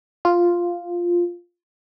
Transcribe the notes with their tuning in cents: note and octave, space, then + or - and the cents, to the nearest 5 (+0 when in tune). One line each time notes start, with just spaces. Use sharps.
F4 +0